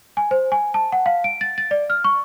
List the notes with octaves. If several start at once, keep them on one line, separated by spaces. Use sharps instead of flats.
G#5
C5
G#5
A5
F#5
F5
D7
A6
A6
D5
F6
C#6